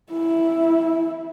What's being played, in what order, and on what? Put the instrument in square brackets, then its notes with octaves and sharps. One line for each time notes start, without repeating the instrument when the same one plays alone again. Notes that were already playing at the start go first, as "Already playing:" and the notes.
[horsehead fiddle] E4